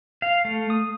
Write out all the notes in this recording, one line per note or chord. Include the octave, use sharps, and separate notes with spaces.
F5
A3
D#6